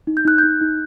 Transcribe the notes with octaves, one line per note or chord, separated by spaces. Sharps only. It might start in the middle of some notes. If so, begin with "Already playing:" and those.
D#4
G6
D#4 F#6
D#4 G6
D#4